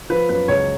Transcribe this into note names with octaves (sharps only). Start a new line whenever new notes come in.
F3 B4
F#2 B4
C#2 C#5